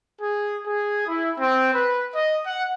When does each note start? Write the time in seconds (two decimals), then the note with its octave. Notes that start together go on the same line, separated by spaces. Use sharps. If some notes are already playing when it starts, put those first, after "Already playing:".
0.20 G#4
0.66 G#4
1.07 E4
1.39 C4
1.72 B4
2.14 D#5
2.45 F#5